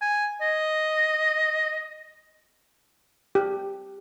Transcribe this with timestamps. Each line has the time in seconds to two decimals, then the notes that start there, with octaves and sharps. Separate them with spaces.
0.02 G#5
0.42 D#5
3.35 G4